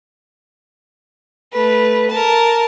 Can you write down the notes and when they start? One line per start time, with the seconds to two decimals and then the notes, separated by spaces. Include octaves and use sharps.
1.52 A3 B4
2.10 A#4 A5